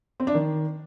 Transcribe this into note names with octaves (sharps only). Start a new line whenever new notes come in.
C4
D4
D#3